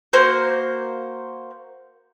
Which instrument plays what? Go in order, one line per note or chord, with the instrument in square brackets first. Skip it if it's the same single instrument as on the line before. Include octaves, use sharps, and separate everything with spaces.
[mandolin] A#3 F#4 C5 G6